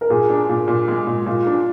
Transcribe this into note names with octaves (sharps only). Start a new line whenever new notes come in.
A#4
A#2 G#4
D4
A#2
A#2
G#3
A#2
A#2 F4
D4